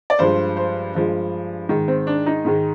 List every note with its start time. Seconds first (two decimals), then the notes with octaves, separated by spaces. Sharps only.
0.10 D5
0.19 G2 F3 G#3 C5
0.57 C5
0.95 G2 F3 G#3
1.69 G#2 D#3 G#3
1.88 C4
2.07 D4
2.26 D#4
2.45 G#2 D#3 G#3